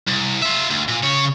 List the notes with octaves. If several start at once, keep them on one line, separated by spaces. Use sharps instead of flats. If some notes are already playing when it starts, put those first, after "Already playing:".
C2
F4 E5
D2
A#2
C#3 C#5